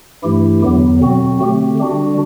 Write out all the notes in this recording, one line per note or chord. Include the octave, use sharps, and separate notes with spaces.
G2 E3 A3 E4 G4
E2 D3 F#3 B3
B2 F#3 C4 F#4
D3 A3 C4 G4
D3 G3 D4 F#4